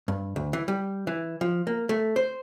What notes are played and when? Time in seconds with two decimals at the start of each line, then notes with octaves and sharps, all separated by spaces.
0.08 G2
0.36 D2
0.53 E3
0.68 G3
1.07 E3
1.41 F3
1.67 A#3
1.89 A3
2.16 C5